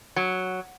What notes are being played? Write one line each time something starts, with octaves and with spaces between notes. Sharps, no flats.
F#3